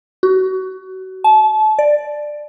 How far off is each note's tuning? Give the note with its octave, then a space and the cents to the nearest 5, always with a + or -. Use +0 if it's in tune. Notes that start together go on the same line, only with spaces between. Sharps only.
F#4 +25
A5 -30
D5 +10